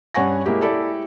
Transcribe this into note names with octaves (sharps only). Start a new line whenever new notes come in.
G2 C#4 F#5 G#5 C#6 A#6
G#3 A#3 E4 G4
E4 G4 A4 D5